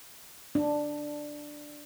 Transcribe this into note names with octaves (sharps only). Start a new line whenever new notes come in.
D4